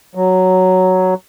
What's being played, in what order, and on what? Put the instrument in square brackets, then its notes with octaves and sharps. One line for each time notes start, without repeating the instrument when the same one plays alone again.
[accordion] F#3